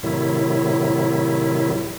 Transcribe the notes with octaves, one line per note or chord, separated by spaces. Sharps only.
A2 C3 D#3 F#3 E4